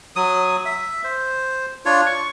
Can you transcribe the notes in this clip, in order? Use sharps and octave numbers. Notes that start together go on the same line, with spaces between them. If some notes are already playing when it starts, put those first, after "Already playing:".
F#3 D#6
E5
C5
D4 F4 C#5
C#6